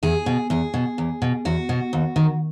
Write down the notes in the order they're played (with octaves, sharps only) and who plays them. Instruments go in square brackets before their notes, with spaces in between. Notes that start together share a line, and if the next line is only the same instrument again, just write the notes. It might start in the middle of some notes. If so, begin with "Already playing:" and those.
[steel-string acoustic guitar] E2 G#4
B2
E2 G#4
B2
E2
B2
E2 F#4
B2
D#2
D#3